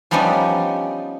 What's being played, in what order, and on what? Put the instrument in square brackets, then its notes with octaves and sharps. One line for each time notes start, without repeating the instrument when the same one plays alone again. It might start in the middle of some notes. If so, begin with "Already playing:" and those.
[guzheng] F3 G3 B3 C#4 D#4 D5